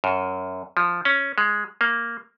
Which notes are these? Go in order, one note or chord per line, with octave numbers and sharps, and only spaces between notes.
F#2
F3
C#4
G#3
A#3